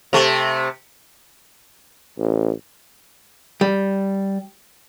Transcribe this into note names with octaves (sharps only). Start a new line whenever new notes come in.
C3 A3
A1
G3